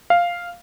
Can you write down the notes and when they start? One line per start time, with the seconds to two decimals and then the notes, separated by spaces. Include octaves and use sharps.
0.10 F5